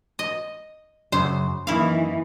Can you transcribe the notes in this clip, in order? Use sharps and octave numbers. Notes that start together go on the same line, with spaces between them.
D#5
F#2 C#3 F#3 C5
F#2 D#3 E3 A#3 E4 F5